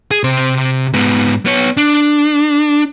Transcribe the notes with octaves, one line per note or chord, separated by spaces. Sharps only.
G#4
C3 C5
G#2 B3
B3 C#5
D4